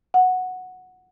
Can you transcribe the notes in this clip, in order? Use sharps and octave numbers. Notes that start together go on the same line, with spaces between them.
F#5